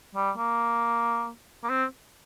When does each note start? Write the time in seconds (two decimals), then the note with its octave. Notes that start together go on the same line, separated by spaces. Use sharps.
0.15 G3
0.37 A#3
1.64 A#3
1.69 C4